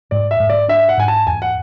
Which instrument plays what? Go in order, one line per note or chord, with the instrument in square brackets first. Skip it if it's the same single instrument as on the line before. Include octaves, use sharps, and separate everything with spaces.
[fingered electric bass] G#2 [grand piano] D5
[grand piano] E5
[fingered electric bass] G#2
[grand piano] D5
[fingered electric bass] D4 [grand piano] E5
[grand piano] F#5
[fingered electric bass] G#2 [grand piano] G#5
[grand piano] A5
[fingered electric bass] E2 [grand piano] G#5
[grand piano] F#5